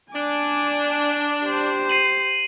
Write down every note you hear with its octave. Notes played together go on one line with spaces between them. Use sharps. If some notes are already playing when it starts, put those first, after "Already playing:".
D4 G#5 D6
G4 C5
C7 D#7 F#7